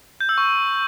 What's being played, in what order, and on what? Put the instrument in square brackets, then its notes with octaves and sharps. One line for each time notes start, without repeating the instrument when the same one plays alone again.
[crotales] G6
E6
C#6